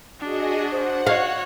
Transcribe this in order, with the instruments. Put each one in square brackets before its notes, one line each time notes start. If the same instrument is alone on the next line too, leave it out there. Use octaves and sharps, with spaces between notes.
[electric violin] D4 [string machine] F#4 G#4 D#5
[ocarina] C5 [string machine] F#5
[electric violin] F#4 C#5 [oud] F5